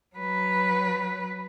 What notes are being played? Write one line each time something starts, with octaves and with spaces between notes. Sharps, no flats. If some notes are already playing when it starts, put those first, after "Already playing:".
F#3 B4